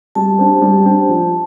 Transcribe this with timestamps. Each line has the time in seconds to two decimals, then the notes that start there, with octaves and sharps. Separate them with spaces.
0.15 G3 A5
0.39 D4 G4 C5
0.62 G3
0.85 D4 G4 C5
1.09 F3